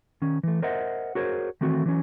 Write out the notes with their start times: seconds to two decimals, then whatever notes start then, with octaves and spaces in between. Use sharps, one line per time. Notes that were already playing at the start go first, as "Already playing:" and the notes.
0.22 D#3 C#4
0.43 E3 A3
0.62 A#4 C5 D#5 E5 F#5
1.15 F#4 G#4 A#4 C5 C#5
1.61 D#3 E3 A3 C4 F#4
1.86 E3 F#3 C#4